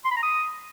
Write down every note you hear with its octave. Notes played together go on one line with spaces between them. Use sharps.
C6
B5
A#5
D#6